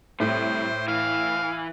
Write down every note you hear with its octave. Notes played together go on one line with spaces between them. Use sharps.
A2 C3 G3 C5
E3 F5